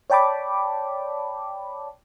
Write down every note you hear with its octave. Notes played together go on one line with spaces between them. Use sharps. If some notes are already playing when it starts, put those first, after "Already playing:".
C#5 D5 G5 A5 B5 D6